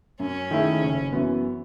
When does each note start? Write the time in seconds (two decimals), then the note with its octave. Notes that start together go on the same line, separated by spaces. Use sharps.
0.19 F#2 C#4
0.51 D#3 A3 E4 G#4
0.81 F#1
1.11 F#2 E3 B3 F#4